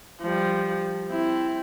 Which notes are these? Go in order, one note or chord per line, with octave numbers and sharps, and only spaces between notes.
F3 G3
C4 E4